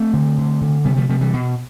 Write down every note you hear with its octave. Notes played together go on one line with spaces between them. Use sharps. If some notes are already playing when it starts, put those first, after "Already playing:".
Already playing: A3 C4
D3
D3
D3
C3 G3 B3
F3 A3
C3 F3 A3
E3 G3
B2